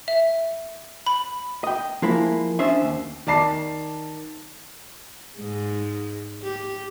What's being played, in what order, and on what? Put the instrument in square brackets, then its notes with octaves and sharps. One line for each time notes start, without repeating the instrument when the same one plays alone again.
[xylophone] E5
B5
[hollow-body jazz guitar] D#5 G5
F3 G#3 A#3 E4
C#4 D4 C5 D#5 E5
D#2
[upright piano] D#3 D5 A5 C7
[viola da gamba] G#2 G#3
G4